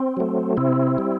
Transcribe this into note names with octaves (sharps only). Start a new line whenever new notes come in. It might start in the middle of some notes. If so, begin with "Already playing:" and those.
Already playing: C4
F#3 A3
C3 C4 E4
G3